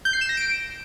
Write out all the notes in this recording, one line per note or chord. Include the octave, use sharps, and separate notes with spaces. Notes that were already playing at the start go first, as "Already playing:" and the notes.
G6
C7
E7
A#6
D7